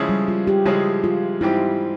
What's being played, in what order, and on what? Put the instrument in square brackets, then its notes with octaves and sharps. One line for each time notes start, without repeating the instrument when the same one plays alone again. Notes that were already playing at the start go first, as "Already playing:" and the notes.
Already playing: [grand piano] C#3 F3 G#3 C#4 E4
[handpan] G3
F4
G4
[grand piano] C#3 F3 G#3 C#4 E4 [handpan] G4
[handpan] F4
[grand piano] G#2 G3 C4 G4 [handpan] E4